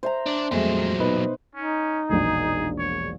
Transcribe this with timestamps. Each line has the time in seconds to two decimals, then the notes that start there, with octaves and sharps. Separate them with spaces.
0.03 C5 E5 A#5
0.26 D4 D5
0.51 F2 A#2 F#3 G#3 A3 C6
1.00 B2 D#4 B4
1.56 C#4 D#4
2.10 E1 A#1 G#4
2.79 C#5